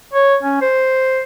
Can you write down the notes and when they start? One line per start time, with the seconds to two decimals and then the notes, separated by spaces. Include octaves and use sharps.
0.14 C#5
0.43 C#4
0.61 C5